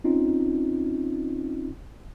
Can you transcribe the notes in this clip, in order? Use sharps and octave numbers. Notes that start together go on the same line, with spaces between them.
C4 C#4 D#4 F4